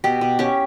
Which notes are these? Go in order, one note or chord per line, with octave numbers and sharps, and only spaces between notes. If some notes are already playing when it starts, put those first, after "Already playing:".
B2 G4
B2
C#4 G4